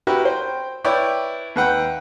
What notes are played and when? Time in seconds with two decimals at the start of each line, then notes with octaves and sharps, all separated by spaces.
0.07 E4 F#4 G4 A#4 B4
0.25 C5 G5
0.84 E4 B4 C#5 D5 G5
1.56 D#2 B4 F#5 G5